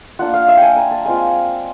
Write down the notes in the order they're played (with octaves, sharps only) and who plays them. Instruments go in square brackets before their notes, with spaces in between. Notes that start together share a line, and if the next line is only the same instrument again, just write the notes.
[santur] A#3 D4 F4 F#5
F5
E5
G5 G#5
A#5
A5
G#3 C4 F4 G#5